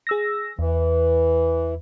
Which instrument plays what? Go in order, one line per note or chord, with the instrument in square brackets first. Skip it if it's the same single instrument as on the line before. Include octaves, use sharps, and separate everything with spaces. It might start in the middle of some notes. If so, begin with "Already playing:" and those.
[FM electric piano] G#4 E6 A#6
[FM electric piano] E2 [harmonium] E3